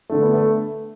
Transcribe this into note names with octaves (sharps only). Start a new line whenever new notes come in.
D3 A3
B3
A3